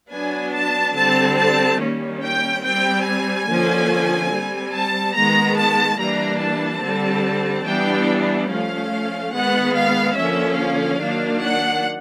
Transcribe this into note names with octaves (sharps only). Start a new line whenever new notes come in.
F#3 B3 D4 G#5
A5
D3 G3 C4 A5
A5
D#3 G3 A#3 C#4
G5
G3 C4 G5
G#5
D3 F3 A#3 C#4
G3 C4
A5
D#3 G#3 B3 A#5
A5
E3 G3 A#3 D4 A#5
A5
D3 G3 C4
E3 G3 B3 D4 G5
F3 A3 C#4 F5
D#3 G#3 B3 F#5
F5
D3 F3 A#3 C#4 E5
F5
D#3 F#3 A#3 D4
F#5